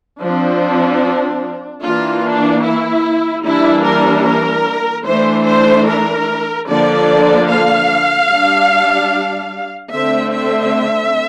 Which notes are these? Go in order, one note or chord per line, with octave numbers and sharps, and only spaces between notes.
F3 C4 D4
E3 A#3 D4 F4
D4
E4
E3 G3 A#3 D4 E4
A#4
A#4
E3 A3 D4 C5
C5
A#4
D3 F3 A#3 D4 D5
F5
G3 D4
D3 A3 C4 E5
E5